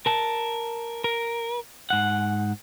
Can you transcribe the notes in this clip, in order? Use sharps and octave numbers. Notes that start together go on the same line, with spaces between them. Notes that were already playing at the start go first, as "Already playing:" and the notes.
A#4 A5
A#4
G#2 F#5